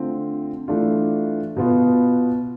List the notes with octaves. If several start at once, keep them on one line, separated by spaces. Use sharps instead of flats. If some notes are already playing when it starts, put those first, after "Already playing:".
Already playing: D3 A3 C4 F4
E3 A3 D4 F4
B2 B3 F4